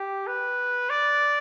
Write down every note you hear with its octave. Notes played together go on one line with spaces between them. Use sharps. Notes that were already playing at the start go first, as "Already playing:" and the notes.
Already playing: G4
B4
D5